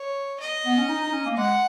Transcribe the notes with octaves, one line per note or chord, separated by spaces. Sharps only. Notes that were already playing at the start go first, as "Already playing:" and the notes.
Already playing: C#5
D#5
B3
C#4
D#4
D#4
C#4
A#3
G#3 F#5